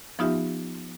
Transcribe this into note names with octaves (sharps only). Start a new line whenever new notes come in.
F3 B3 D#4 F4 G4 E5